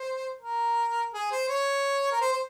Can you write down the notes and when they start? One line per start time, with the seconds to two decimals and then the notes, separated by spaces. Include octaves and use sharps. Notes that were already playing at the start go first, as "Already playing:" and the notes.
Already playing: C5
0.41 A#4
1.14 G#4
1.32 C5
1.49 C#5
2.12 A#4
2.21 C5
2.32 C5